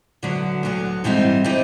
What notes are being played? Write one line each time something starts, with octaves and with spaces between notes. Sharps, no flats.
D2 D3 F#3 B3
D2 D3 F#3 B3
G#2 E3 G3 C4 D#4
E3 G3 C4 D#4